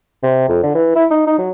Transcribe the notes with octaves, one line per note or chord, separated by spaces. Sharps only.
C3
F2
D3
E3
E4
D#4
D#4
F#3